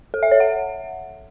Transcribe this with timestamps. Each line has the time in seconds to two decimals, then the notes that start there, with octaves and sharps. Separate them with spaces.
0.14 A4
0.23 E5
0.31 C#5
0.40 F#5